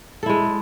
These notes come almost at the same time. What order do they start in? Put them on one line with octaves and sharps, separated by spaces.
A4 E4 G#3